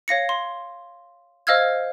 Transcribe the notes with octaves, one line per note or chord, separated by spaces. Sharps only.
C#5 F5 A#6 C#7
C6
C5 D#5 F5 E6 F6 G#6